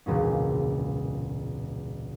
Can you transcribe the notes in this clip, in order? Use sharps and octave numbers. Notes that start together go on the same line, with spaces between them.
E1 C#2 A#2 C#4